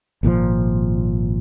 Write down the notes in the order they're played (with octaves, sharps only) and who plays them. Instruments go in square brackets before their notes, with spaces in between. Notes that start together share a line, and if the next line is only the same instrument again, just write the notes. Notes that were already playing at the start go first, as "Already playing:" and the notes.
[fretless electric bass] G#1 A#2 C#3 F3